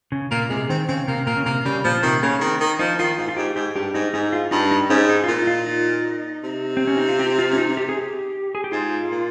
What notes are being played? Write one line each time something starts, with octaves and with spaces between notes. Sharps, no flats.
C#3
A#2 A#3
C3 G#3
D#3 C4
C#3 C4
C3 A#3
A#2 A#3
C#3
C3 A#3
C#3 G3
A#2 F3
C3 D#3
C#3 A#3
D#3 C4
D#3
F3 D#4
D#3 F4
G#2 F4
F4
G#2 G4
G#2 G4
G2 G4
G#2 D#4
G#2 D#4
F4
G2 D#4
D#4
G#2 C#4
D#4
F4
A#2 D#4
F4
D#4
C3
C4
C#4
D#4
F4
G4
F4
C#4
D#4
G4
G#4
G4
G#4
G4
G#2 F4
A#2